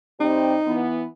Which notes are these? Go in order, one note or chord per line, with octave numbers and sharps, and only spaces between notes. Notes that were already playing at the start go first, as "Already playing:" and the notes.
C3 G3 C4 D#4
E3 B3